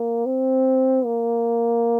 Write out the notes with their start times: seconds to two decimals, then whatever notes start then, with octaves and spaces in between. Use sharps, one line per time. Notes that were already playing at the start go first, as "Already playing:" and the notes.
Already playing: A#3
0.26 C4
1.05 A#3